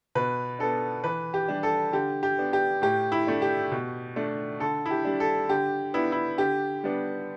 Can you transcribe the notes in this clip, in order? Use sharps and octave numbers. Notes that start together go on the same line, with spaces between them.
B2 B4
B3 D4 A4
E3 B4
G4
G3 D4
A4
D3 G4
G4
B3 D4
G4
A2 G4
E4
A3 D4
G4
B2
A3 D4
D3 A4
E4
G4
G3 D4
A4
D3 G4
B3 D4 E4
E4
D3 G4
G3 B3 D4